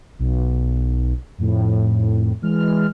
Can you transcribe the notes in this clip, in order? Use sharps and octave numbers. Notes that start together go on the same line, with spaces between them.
B1
F2 A2
E3 G#3 F6